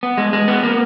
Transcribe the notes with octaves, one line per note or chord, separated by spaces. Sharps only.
B3
G#3
G#3
B3
A#3